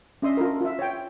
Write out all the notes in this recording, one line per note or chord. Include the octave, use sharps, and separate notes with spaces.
C#4 D4 D#5 E5 C6 D#6
F4 A4 A#4
F4 E5
C#5 G5